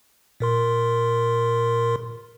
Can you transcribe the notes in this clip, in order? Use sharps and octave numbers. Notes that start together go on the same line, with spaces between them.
A#2 A#4 C6